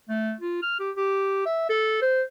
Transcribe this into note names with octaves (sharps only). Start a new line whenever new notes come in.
A3
F4
F6
G4
G4
E5
A4
C5